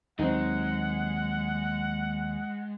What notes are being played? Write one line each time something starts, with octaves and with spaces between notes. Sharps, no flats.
D#2 F#3 G#3 C4 D#4 F#5